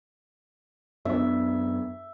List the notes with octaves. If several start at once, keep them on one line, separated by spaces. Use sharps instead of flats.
F#2 B3 D4 E5